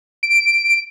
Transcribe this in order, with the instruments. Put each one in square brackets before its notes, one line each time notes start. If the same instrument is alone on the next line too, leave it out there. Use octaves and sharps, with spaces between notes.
[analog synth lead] D7